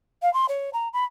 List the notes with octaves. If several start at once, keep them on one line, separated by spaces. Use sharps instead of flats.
F5
C6
C#5
A#5
B5